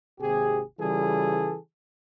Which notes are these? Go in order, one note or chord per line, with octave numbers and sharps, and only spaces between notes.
G#1 D#2 C3 G4 G#4
C#3 E3 G3 F4 G#4 A4